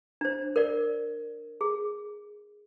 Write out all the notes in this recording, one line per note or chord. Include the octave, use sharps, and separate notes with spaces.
D4 C5
A#4 D5
G#4